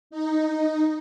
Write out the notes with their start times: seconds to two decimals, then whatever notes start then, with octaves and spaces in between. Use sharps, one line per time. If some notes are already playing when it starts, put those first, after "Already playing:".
0.10 D#4